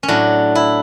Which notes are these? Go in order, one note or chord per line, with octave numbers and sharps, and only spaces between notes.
C#4
A2 F#3 D4
E4